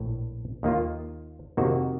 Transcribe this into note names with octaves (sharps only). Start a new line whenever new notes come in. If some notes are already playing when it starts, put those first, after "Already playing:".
Already playing: A#1 A2
D#2 D#3 A#3 F4
F2 C3 D#3 A#3 F#4